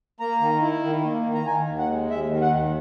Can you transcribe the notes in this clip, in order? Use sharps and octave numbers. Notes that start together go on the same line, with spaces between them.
A#3 A#5
D#3
E4
D#3
A#3
D#3
A#5
D#3 G#5
D#2
F#5
G#3
D#2 E5
D#3
F#5
D#2